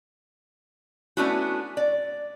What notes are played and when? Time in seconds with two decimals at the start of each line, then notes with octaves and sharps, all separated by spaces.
1.17 A3 B3 C#4 D4 E4 F#4
1.77 D5